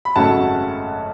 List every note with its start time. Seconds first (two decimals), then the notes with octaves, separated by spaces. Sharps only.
0.05 B5
0.16 G#1 F#2 C#3 F#3 A3 F#5 A5